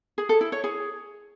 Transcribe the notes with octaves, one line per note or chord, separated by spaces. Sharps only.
G#4
A4
E4
C#5
G#4